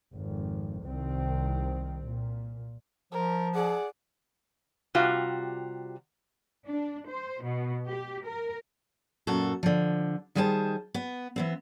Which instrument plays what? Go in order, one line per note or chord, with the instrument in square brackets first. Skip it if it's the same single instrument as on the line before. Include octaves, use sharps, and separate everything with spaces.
[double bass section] G#1 F2
C2 D#3 C4
A#2
[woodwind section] F3 [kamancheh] A#4
[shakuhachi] G#4 [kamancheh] D5 F#5
[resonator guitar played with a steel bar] C3 G3 F4 F#4
[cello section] D4
C5
B2
G4
A#4
[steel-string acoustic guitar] F#2 A#2 F#4 A4
D3 F3
D#3 G3 G#4 C5 G5 A5
B3
E3 B3 C4